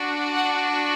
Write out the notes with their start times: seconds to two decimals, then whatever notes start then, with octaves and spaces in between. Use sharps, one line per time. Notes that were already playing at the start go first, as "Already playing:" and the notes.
Already playing: D4 F#4
0.34 F#5